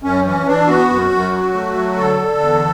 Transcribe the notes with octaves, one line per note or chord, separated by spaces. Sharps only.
F#2 C#4
E3 C#4
E3 D4
B3 F#4
F#2
F#2
F#3
A3
F#3
D3 A4
D3
E2